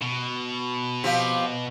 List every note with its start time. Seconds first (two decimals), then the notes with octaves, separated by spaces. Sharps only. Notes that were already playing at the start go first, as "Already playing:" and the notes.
0.02 B2
1.04 F3 C4 G4